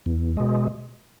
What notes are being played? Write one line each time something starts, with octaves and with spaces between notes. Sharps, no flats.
E2
B2 G#3